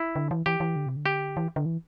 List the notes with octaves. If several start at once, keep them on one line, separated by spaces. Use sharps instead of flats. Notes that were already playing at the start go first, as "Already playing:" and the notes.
Already playing: E4
D3
E3
E3 G4
E3
D3
C3
D3
G4
E3
D3
E3